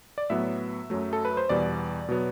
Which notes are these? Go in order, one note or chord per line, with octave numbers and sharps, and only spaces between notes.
D5
A2 F#3 B3 E5
F#2 F#3 A3
A4
B4
C5
E2 B2 G3 B3 D5
B2 F#3 B3